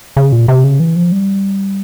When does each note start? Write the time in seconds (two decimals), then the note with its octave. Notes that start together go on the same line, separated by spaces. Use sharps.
0.17 C#3
0.32 A#2
0.48 C3
0.64 C#3
0.80 E3
0.96 F3
1.12 G3